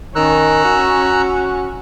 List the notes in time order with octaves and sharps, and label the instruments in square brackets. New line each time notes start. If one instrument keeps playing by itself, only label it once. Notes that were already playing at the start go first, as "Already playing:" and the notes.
[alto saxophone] D#3 [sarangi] C#4 [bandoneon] A#5 E6 F#6
[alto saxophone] F#4